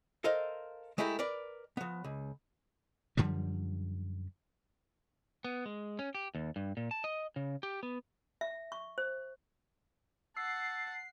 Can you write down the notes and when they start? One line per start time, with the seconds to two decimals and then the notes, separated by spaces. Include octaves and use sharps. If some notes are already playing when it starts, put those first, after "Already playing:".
0.24 A4 A#4 C5 D#5 F5
0.98 G#3 A3 E4 G4 G#4 A#4
1.19 A#4 B4 D5
1.77 F3 B3
2.04 C#2
3.17 F#2 D3 F3 G3
5.44 B3
5.66 G#3
5.99 C#4
6.15 G4
6.35 D#2
6.56 G2
6.77 A#2
6.91 A5
7.04 D#5
7.36 C#3
7.63 G4
7.83 B3
8.41 E5
8.72 C#6
8.98 C5
10.37 F#5 A5 E6 C7